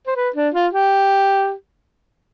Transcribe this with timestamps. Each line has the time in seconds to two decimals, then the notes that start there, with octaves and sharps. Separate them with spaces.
0.07 C5
0.16 B4
0.36 D4
0.54 F4
0.73 G4